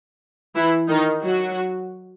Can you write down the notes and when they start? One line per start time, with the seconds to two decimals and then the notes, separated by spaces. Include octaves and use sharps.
0.55 E3 E4
0.89 D#3 D#4
1.23 F#3 F#4